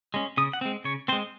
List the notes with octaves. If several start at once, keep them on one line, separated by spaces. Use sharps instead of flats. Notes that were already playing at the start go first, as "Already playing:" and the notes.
G#3 C#4
C#3 D#6
F#5
G#3 C4
C#3 C#5
G#3 C4 C5